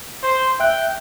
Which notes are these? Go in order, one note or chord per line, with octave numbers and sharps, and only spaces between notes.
C5
E5 G5 F#6